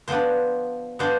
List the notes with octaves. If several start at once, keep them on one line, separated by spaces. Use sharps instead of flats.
F3 B3 D4 C5
F3 B3 D4 C5